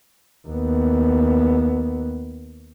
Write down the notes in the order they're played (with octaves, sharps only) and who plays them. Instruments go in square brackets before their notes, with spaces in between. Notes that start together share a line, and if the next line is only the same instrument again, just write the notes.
[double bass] D#2 B3